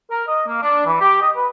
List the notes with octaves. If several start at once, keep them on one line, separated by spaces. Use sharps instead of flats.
A#4
D#5
A#3
D4
E3
G4
D#5
B4